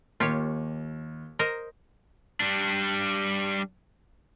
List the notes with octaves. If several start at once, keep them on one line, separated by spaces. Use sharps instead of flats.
D#2 F4 G4 C#5
A#4 C5 D#5
G3 D4